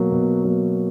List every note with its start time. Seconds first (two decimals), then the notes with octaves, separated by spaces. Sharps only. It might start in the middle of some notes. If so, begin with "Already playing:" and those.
Already playing: B2 F#3 A#3
0.12 B2
0.44 F#3 A#3